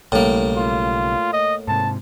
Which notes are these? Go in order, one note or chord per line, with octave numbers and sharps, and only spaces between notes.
B1 A2 C#3 G3 A#3
F4
D#5
G#2 C3 A5